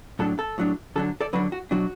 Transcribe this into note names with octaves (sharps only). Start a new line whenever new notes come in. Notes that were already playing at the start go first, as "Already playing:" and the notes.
A2 F#3 D4 A4
A4
A2 F#3 D4
D3 F#3 D4 A4
A4 D5
D3 F#3 D4 F#4 B4
F#4
B2 F#3 D4 F#4